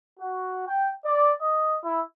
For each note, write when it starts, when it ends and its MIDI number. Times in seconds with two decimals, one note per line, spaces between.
0.19 0.67 66
0.67 0.90 79
1.05 1.31 74
1.40 1.77 75
1.83 2.01 64